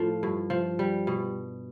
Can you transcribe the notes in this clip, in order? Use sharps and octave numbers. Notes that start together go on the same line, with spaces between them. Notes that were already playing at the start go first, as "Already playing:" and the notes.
Already playing: A2 F3
G2
F3
G3
B2